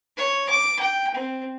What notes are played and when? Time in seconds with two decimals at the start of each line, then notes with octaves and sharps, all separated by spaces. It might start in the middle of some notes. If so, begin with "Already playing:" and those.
0.17 C#5
0.49 D6
0.79 G5
1.14 C4